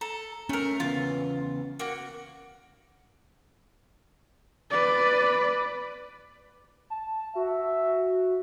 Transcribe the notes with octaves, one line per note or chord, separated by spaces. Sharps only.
A4 A#5
A3 C#4 A#4
E2 C#3 B3 F4
A#3 F#4
B4 D5
A5
F#4 E5